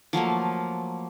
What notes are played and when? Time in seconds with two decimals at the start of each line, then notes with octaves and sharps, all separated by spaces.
0.13 F3 F#3 A3 A#3